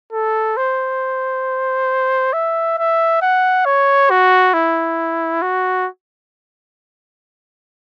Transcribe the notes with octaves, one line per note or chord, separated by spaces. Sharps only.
A4
C5
E5
E5
F#5
C#5
F#4
E4
F#4